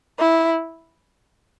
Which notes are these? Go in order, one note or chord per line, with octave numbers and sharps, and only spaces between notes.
E4